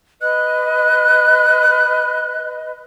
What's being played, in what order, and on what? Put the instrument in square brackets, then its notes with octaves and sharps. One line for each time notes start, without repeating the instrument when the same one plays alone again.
[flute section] B4 D#5 [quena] F#6